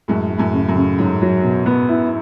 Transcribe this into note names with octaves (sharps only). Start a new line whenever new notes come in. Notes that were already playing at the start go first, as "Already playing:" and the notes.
F#2 A2 G#3
G#3
F#2 A2
C#3
F#2
C#3
G#2 F#3
F#3
B2
B3
E4